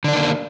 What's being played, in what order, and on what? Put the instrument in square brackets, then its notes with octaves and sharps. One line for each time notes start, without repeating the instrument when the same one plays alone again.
[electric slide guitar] D3
D4
D#3
A#3